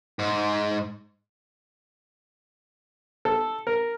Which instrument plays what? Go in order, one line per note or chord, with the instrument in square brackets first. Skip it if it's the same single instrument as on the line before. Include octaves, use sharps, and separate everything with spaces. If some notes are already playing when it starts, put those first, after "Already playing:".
[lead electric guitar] G#2
[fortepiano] A4
A#4